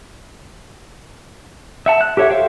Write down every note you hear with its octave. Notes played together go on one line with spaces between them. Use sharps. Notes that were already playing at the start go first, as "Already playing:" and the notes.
E5 F#5 A5
F#6
G4 A4 C#5 E5 F#5
A4 C5 E5 F5 G5